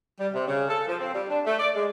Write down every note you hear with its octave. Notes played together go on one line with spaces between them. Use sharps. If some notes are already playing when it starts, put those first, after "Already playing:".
G3
C3
C#3
A4
F3
C4
G3
D4
A3
D5
G#3